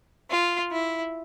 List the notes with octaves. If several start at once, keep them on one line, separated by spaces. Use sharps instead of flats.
F4
E4